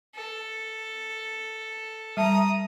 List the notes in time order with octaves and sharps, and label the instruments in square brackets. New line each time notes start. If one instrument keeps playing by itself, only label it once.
[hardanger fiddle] A4
[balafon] G3 E5 A5 [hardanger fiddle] A#5 D#6